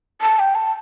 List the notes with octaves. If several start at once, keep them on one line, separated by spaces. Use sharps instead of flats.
A5
G5
A5